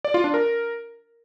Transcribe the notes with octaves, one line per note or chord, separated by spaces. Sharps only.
D5
F4
D4
A#4